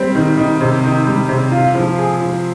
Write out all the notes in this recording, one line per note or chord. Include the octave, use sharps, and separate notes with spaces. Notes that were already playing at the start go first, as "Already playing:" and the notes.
Already playing: G3 C4
D#3
D#3
C3
D#3
G3
C3
F4
F3
G#4
F3